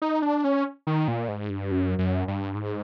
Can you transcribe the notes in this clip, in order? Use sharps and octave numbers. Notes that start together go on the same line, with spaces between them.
D#4
D4
C#4
D#3
A#2
G#2
G2
F#2
F#2
G2
G#2